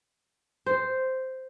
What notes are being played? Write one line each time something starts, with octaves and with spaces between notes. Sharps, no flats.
C5